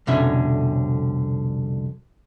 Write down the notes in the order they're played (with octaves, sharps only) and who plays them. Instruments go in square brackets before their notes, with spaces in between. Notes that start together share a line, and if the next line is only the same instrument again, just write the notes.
[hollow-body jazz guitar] C2 F2 B2 D3 C#4 E5